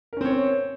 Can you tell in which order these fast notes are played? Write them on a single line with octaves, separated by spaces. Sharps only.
A#4 C#4 C4 C#5